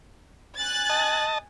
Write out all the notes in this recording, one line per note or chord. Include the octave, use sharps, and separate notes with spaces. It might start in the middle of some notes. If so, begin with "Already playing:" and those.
G#5 F#6 A6
D#5 A5